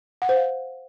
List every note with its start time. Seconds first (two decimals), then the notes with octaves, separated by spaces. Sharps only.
0.22 F#5
0.29 C5
0.36 F5